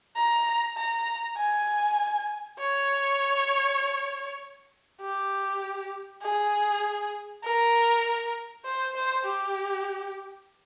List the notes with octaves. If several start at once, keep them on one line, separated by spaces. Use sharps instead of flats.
A#5
A#5
G#5
C#5
G4
G#4
A#4
C5
C5
G4